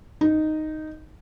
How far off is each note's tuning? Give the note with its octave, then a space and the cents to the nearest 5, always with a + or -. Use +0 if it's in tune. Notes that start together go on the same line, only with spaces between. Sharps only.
D#4 -5